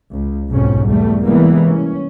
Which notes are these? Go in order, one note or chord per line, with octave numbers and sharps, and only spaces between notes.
C#2
B1 F2 G#2 B2 C#4
E2 G3 A3
C3 E3 G3 G#3 A#3 B3
C#4